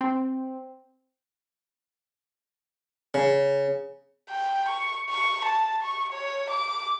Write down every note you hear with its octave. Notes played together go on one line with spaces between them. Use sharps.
C4
C#3
G5
C#6
C#6
A5
C#6
C#5
D6